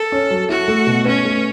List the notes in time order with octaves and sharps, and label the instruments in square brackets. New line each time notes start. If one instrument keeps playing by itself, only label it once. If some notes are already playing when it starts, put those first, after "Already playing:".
Already playing: [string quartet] A4
[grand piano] C#4
F#3
[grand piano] E4 [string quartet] F#4
[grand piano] A3
B2
[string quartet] C#4 [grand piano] B4
[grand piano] A3